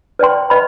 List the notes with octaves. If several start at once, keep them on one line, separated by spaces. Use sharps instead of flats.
B4 D5 G5 C6
B4 D#5 B5